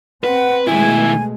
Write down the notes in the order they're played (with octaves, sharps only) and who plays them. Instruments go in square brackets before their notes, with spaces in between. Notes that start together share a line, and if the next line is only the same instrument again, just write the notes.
[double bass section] C4 [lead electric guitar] B4 [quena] F#5
[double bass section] B2 G#3 A3 [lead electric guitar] D#3 E4 [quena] G#5